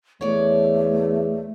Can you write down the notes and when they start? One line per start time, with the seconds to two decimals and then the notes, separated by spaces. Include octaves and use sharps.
0.21 E2 A3 C#5 D5